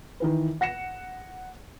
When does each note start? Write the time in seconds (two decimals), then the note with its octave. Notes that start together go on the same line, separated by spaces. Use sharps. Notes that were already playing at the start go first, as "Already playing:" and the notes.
0.20 D#3 E3 B4
0.61 F#5 A#6 C#7 E7